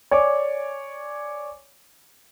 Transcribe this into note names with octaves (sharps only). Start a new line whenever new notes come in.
C#5 D5 G#5 D6